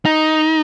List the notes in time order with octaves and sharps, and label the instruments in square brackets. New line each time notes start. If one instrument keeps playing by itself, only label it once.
[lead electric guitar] D#4